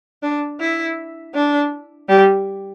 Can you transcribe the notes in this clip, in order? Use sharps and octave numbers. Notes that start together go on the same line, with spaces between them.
D4
E4
D4
G3